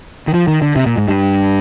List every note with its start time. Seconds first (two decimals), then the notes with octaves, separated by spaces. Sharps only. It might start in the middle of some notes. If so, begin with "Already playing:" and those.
0.28 D#3
0.34 F3
0.48 D#3
0.62 D3
0.76 C3
0.86 A#2
0.97 G#2
1.08 G2